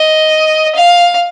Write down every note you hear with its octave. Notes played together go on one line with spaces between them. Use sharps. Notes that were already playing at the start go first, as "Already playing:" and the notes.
Already playing: D#5
F5